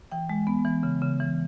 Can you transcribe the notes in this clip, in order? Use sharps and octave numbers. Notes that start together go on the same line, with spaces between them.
E3 G5
G#3
B3
E3
C#3
C#3
E3